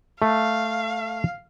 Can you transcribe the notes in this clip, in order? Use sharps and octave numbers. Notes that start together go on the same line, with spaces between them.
A3 F5